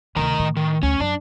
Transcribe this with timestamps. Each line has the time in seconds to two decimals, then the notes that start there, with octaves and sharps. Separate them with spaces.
0.16 D2 C3 D#3 A#4 A#5
0.39 A2
0.57 D#3
0.83 D2 C#4
1.00 F#2 D4